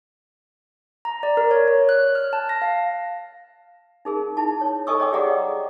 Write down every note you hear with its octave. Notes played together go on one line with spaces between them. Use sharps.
A#5
D5
A#4
C#5
C#5
F#6
F6
A5
A#6
F5
D#4 G#4 A#4
D#4 E4 A5
C#5
A4 D#5 G#5 C#6 D#6 E6
C#5 D#5 G5 D6
G4 G#4 D5 D#5 F#5 A#5